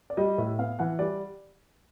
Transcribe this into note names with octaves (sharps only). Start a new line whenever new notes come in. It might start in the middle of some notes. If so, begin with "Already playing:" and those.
D5
G3 D#5
A2 E5
B3 F5
E3 F#5
G3 D5